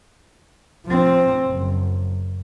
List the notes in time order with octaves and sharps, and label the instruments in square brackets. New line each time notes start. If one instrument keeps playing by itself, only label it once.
[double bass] F3 C4
F#1